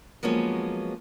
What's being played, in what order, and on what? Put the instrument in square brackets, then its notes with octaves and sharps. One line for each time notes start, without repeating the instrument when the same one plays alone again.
[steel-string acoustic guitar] F3 F#3 G#3 A#3 B3 C#4